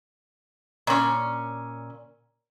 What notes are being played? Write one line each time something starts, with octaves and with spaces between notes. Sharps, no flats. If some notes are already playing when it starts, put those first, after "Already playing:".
A#2 C#4